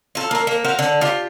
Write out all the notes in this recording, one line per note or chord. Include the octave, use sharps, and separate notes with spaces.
F4 A4
A#3 A#4
A#3
F#4 A#4 C5 F5
D3
F4 G4